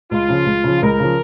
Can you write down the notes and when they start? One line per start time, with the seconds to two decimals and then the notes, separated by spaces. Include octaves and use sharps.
0.11 C#2 F4
0.29 C#3 F3
0.46 C#2
0.64 C#3 F3
0.82 C#2 A#4
0.99 C#3 F3